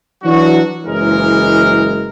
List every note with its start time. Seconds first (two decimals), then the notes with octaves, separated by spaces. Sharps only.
0.22 E3 F#3 D4 F#4
0.85 F#1 E3 G#3 A#4